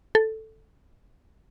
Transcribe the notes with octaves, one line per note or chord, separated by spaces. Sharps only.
A4